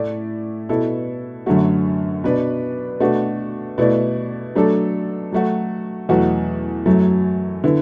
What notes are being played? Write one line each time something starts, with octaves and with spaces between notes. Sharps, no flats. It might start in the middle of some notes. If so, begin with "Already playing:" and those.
Already playing: A2 A3 E4 D5
B2 B3 E4 A4
F#2 D3 F#3 A3 F#4
B2 B3 D4 B4 D5
B2 A3 D4 F#4
B2 A3 E4 D5
F#3 A3 D4 A4
F#3 A3 F#4
E2 B2 F#3 A3 F#4
F#2 F#3 A3
D3 B3 E4